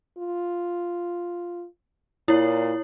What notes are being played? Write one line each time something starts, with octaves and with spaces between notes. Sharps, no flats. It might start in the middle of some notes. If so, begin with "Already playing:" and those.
F4
A#2 E4 C#5